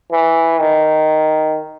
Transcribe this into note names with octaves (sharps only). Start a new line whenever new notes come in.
E3
D#3